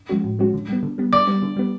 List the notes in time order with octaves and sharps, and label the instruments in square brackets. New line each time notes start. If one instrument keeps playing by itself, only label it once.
[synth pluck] F3 G#3 C#4 F#4
A2
F3 G#3 C#4 F#4
D3
G3 B3
D3
G3 B3
[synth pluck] D3 [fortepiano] D5
[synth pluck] G3 B3
D3
G3 B3